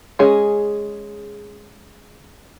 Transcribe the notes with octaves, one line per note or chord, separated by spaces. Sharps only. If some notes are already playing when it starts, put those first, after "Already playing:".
G#3 C#4 G#4